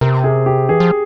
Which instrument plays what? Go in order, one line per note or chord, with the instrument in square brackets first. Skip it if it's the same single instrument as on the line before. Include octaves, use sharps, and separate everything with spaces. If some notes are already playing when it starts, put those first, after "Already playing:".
[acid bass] C3 [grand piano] A#4
[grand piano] G#4
G4
[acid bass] E3 [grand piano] G#4
[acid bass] F3